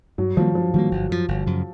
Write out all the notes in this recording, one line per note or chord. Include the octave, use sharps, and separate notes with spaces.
G2 F#3
D#3 F3 G3 A#3
G2 F3
D#3 F#3 G3 A#3
G1
F#2 C#3 F3
G1
F#2 C#3 F3